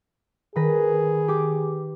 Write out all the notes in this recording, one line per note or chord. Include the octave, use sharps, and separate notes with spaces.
D#3 G#4 B4 A#6
G4 D6